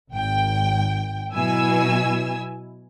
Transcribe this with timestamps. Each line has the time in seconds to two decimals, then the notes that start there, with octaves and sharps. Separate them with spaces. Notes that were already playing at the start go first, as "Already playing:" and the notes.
0.12 G#1 G5
1.34 B2 F#3 E4 G#5 E6